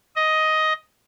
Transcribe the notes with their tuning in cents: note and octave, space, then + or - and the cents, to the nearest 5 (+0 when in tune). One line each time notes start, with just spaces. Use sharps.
D#5 +10